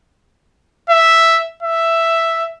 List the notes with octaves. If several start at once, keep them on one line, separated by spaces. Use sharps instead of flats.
E5
E5